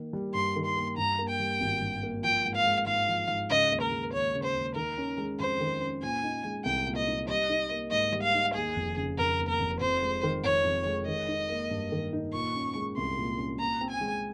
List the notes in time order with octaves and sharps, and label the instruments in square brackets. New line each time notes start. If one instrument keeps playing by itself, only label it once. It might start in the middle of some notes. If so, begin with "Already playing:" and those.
Already playing: [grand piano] D#3 A#3
G3
[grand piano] G2 [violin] C6
[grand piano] D#3
[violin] C6
[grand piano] A#3
[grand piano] G2 [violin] A#5
[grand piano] A#3
[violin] G5
[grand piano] G3
G#1
G2
A#3
[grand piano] F3 [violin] G5
[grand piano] G#2
[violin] F5
[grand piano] G#3
[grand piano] G#2 [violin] F5
[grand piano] F3
G#2
[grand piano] C#3 [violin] D#5
[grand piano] D#2
[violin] A#4
[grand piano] G#3
[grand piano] D#2 [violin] C#5
[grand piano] C#3
[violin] C5
[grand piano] D#2
[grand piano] D#3 [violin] A#4
[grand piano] C#4
G#3
[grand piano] F2 [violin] C5
[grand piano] D#3
C#4
[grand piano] A#2 [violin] G#5
[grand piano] D#4
G#3
[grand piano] C2 [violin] G5
[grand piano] A#2
[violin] D#5
[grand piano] D#4
[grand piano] G3 [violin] D#5
[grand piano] D#4
A#3
[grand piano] G#2 [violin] D#5
[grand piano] G3
[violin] F5
[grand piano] D#4
[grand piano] D#2 [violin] G#4
[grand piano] F1
C#3
[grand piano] F1 [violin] A#4
[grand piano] D#2
[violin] A#4
[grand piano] F1
[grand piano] F2 [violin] C5
[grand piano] G#3
D#3
[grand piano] F1 [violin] C#5
[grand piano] F2
G#3
[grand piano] D#3 [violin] D#5
[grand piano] D#4
A#3
G2
D#3
D#4
[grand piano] A#2 [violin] C#6
[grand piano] C#4
G#3
[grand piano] C2 [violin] C6
[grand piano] A#2
C#4
[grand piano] A#2 [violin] A#5
[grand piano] C4
[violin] G#5
[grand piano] G#3